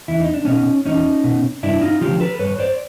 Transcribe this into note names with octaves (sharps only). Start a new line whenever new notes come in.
E2 E4
D#4
D4
B2 C#4 D#4
E2 C#4 D#4
B2
G2 D4 E4
D#4 F4
D3 F3 F4 G4
A4 B4
G2 B4 C#5
C5 D5